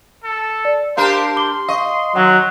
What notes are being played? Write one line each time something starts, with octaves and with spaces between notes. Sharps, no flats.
A4
D5
D4 G4 A#4 C5 F5
C6 D6 G7
D#5 F5 C#6
D#3 F#3 F#5